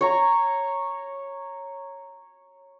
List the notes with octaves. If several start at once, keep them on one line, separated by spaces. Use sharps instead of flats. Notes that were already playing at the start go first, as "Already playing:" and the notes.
C#5 A#5